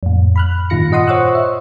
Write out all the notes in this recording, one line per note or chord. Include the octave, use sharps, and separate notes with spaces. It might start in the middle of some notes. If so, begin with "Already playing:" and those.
F2 A2
B5 F6 F#6
G2 A#2 D#3 F4 A#6 C#7
F4 D#5 F#5 C6 D#6
C5 C#5 F#5 C#6 E6 F#6
E5